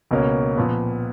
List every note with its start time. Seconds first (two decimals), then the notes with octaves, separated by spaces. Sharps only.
0.11 C#2 B2 A#3 C#4
0.57 A#2 F3 B3